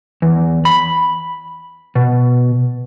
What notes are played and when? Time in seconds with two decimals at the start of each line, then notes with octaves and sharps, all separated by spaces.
0.22 E2
0.65 B5
1.95 B2